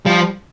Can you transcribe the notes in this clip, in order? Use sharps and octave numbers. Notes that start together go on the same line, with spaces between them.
F3 G3